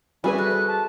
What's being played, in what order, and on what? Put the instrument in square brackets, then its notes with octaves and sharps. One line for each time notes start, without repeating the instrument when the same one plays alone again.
[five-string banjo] G3 G#4 B4 [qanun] F#4 E5 [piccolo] G#5
[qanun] A4 [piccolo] F#6
[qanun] C5
[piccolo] A5